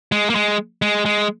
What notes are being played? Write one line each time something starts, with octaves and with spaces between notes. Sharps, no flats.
G#3
A#3
G#3
G#3
G#3